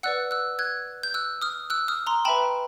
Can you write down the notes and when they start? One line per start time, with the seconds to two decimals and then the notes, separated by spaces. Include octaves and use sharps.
0.03 B4 D5 F#5 E6 F#6
0.31 E6 F#6
0.59 F#6 G#6
1.03 G6
1.14 E6 F#6
1.42 D#6 F6
1.70 E6 F#6
1.88 D#6 F6
2.07 A#5 C6
2.25 B4 E5 G5 A5 B5